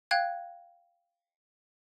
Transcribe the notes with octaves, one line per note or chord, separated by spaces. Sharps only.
F5 G5 F#6 G#6